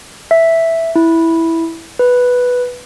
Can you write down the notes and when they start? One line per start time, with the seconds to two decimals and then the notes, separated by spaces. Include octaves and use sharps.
0.31 E5
0.96 E4
1.99 B4